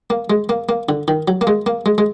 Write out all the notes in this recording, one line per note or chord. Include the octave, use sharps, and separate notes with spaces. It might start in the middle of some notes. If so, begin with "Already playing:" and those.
A#3
G#3
A#3
A#3
D3
D#3
F#3
A#3
G#3
A#3
G#3
G#3